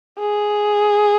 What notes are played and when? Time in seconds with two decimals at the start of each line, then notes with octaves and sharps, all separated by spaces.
0.19 G#4